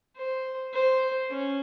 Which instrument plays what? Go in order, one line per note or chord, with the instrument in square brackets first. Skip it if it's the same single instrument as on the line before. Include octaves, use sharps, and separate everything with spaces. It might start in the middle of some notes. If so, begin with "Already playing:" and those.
[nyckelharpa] C5
C5
C#4